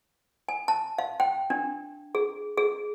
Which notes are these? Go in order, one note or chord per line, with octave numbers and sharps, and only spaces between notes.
G#5
A5
F5
G5
D4
G#4
G#4